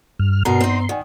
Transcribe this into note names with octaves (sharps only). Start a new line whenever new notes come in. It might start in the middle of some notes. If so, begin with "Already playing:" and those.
G2 F6
G2 B2 B3 A#4 A#5 C6
C4 D#4
D#3 D5 F#5 G#5